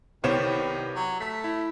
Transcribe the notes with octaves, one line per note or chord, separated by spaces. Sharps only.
C2 D#3 B3 G4 C5 C#5 E7
F#3
A3 B6
E4